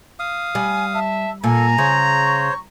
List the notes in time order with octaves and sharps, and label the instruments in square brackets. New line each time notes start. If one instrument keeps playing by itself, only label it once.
[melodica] F5 D#6
[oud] G3 [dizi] G#5
[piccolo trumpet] E5 [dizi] A5
[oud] A#2 [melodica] A4 [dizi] G#5 [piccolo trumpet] A#5
[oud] C#3 [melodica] C5 C#5
[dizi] C#6